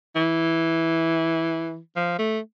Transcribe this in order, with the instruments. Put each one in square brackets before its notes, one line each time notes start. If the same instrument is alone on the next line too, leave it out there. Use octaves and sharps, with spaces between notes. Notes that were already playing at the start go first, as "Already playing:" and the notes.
[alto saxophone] E3
F3
A3